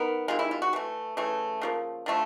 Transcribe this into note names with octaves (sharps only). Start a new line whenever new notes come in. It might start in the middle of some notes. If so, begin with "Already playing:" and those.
Already playing: D#3 B3 A#4
C3 D#3 G#3 F4
E4
F4
F#4
E3 A3
C#3 E3 A3
C#3 F3 A#3
D3 F3 A3